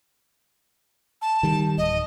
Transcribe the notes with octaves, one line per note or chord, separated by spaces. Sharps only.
A5
D#3 G3
D1 D#5